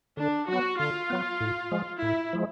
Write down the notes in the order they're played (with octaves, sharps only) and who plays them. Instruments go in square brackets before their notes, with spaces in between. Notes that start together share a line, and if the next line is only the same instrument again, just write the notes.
[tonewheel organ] D3 [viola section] D4
[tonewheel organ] F#3 B3 [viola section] F#4
[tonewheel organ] D3 [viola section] F4
[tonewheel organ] F#3 B3
A2
F3 G#3
[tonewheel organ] A2 [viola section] E4
[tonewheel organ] F3 G#3